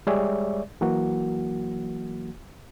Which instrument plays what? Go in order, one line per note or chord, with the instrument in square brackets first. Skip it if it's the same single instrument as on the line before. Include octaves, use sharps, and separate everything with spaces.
[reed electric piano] G3 G#3 G#4 C#5 D5 E5
E3 F#3 A#3 F#4